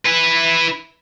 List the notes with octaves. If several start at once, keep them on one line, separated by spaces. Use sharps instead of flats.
E4 B4